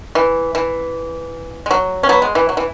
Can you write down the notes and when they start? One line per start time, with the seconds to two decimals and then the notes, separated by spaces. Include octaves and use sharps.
0.15 E3
0.55 E3
1.66 G#3
1.71 F#3
2.03 C#4
2.09 F#3 B3
2.22 G#3
2.35 E3
2.49 F#3
2.57 E3